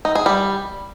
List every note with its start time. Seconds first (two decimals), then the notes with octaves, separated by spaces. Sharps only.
0.05 D#4
0.15 G#4
0.26 G3